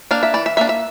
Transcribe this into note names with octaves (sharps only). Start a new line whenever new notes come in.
A#3 D4 F5
E5
E3 D5
E5
A#3 D4 E5
E5